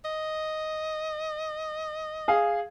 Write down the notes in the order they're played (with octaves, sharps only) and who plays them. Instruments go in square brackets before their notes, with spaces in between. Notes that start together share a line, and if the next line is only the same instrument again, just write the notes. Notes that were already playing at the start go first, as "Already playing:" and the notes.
[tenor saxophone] D#5
[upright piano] G#4 F5